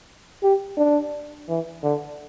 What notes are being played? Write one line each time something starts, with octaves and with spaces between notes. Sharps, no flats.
G4
D4
E3
D3